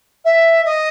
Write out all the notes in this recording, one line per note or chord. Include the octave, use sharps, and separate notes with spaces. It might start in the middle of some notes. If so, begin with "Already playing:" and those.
E5
D#5